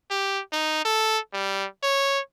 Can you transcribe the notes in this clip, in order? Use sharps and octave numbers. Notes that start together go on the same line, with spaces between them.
G4
D#4
A4
G3
C#5